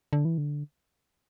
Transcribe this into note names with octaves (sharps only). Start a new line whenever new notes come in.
D3
E3
D3